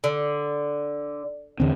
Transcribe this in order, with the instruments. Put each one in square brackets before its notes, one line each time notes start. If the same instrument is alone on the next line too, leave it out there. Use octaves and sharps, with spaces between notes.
[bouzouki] D3
[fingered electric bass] E2 D3 C4